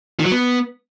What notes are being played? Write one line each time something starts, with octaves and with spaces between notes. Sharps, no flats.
D#3
F#3
B3